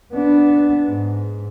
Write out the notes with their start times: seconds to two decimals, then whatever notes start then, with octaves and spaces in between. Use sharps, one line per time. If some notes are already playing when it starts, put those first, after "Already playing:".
0.14 B3 D4
0.87 G#2